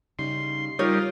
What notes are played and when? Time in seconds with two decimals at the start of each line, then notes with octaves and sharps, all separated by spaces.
0.19 C#3 G3 D#4 C6
0.79 G3 D#4 F4 G4 A#4 C#5